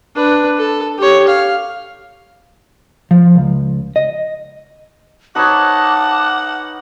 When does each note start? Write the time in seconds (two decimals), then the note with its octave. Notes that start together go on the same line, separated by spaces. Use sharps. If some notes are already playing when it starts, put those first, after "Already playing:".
0.15 D4 B4
0.58 A4
0.98 G4 C#5
1.28 F5
3.11 F3
3.36 C#2
3.96 D#5
5.36 D#4 B4 C#5 F#5 A5 D6